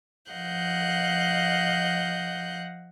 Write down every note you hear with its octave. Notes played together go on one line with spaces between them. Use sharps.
F3 D#5 F5 F#5 F#6 G6